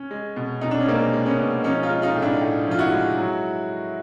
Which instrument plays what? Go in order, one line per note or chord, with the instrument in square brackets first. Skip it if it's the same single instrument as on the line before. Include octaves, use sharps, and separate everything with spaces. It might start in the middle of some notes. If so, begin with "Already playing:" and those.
Already playing: [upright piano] C#4
G#3
B2
B2 D#4
D4
C#4
G#3 A#3 C4
G#3
B3 C#4
B2
F3 C#4 D#4
D#4 F4
G#3
D#4 F4
A2
D4 E4
A2
F3 F4
E4 F#4
G#3
F#3